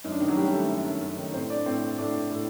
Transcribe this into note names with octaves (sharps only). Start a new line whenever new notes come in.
F#2 D#4
D4
D#3 D#4
F#3 F#4
F#2 G3 G4
D#3 A3 A4
F#2
D#3
F#2
D#3
A2 C4 C5
D4 D5
A2 C4 C5
A2 D4 D5
A2